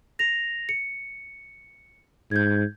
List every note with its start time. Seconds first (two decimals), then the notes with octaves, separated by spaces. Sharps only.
0.19 A#6 F7
0.69 C#7
2.31 G#2 G6 G#6